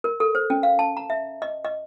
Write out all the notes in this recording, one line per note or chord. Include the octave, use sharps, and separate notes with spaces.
A#4
A4
C5
C#4
F5
A5
A#5
E5
D#5
D#5